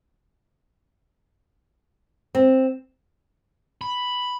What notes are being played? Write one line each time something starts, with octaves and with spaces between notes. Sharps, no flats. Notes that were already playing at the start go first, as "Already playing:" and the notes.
C4
B5